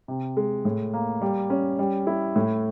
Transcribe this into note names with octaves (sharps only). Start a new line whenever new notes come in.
C3
G#3
A2
A#3
G3
C#4
G3
E4
A2